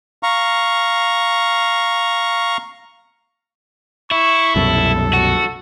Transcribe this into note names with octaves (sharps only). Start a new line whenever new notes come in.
F5 A#5 C#6
E4 C#6
C2 F#2 B2 A4
F#4